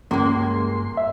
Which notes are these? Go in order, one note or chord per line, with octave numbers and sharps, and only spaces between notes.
C#2 G2 G#3 A#3 C6
E5